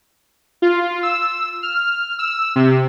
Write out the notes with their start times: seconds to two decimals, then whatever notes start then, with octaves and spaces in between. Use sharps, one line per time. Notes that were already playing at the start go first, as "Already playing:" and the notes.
0.62 F4
1.03 E6
1.63 F6
2.19 E6
2.56 C3